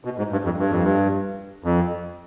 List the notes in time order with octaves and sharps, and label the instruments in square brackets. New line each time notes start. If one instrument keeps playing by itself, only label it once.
[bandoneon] B2
G#2
G2
F2
G2
F2
G2
F2